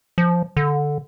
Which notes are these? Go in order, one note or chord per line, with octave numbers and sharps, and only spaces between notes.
F3
D3